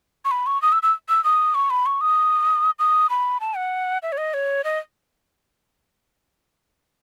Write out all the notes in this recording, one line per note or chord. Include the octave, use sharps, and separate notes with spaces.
C#6
B5
C#6
D#6
E6
E6
E6
D#6
C#6
B5
C#6
D#6
D#6
B5
A5
F#5
E5
C#5
D#5
C#5
D#5